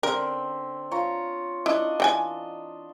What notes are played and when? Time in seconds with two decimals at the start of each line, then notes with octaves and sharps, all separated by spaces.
0.03 D3 C4 A#4
0.91 F4 C#5 A#5
1.66 D4 E4 D#5
2.00 E3 G5 G#5